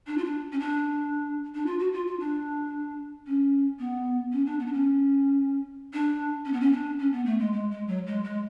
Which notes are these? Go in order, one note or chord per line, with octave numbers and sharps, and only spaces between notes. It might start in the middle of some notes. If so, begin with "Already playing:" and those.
D4
F4
D4
C#4
D4
D4
F4
F#4
F4
F4
D4
C#4
B3
C#4
D4
B3
D4
C#4
D4
C#4
B3
C#4
D4
C#4
B3
A3
G#3
G#3
G#3
F#3
G#3
G#3